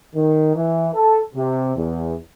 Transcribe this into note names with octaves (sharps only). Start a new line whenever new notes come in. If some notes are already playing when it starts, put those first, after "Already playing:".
D#3
E3
A4
C3
E2